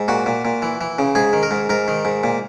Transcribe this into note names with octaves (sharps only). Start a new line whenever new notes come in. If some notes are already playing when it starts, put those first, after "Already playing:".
Already playing: G#2
A#2 F#4
A#2
A#2
E3
E3
C#3
G#2 G#4
D#3
A#4
G#2
G#2 A#4
D#3
G#2
A#2